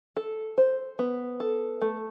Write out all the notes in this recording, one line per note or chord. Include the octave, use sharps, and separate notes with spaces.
A4
C5
B3
A4
A3